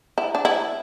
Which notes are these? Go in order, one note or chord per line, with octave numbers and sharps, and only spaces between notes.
E4
D4
E4